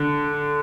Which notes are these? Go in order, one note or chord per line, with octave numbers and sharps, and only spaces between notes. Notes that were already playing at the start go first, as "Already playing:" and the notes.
Already playing: D3